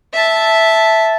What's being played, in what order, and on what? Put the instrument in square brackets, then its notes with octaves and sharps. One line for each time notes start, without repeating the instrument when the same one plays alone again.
[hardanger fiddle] E5 A5